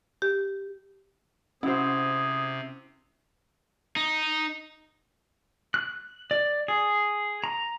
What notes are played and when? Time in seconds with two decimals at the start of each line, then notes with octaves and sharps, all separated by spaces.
0.22 G4
1.63 C3 C#4 E4 F#4 G#4 C5
3.96 D#4
5.74 F#6
6.31 D5
6.68 G#4
7.44 A#5